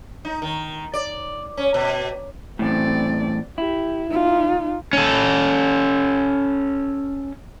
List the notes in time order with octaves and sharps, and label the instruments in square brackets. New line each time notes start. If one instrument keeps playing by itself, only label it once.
[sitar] D#4
D#3
D5
C#4
B2
[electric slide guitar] E2 A2 [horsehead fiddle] C4 D5
[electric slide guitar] E4 [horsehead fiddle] G4
[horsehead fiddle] D#4 F4
[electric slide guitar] C#4 A4